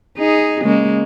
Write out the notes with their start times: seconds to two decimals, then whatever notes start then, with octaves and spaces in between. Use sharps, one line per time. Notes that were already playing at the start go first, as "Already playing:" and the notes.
0.17 D#4 G#4
0.63 C#3 G#3 A#3